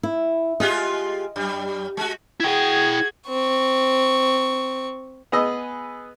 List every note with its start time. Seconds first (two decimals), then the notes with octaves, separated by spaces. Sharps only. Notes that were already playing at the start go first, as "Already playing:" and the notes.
0.03 E4
0.60 G#3 F4 G4 D#5
1.36 F#2 G3
1.97 G#3 F#4
2.40 E4 F#4 G#4 G5 G#6
3.28 C4 C#6
5.32 B3 G#4 B4 D#5 E6